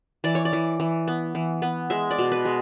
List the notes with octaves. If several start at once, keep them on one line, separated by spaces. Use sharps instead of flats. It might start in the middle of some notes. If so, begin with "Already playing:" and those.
E3 D5
C#5
D5
E3
E3
B3
E3
B3
G#3 E5
D5
B2
B4
G#3